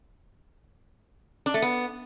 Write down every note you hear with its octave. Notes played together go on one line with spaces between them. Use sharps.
D4
A3
B3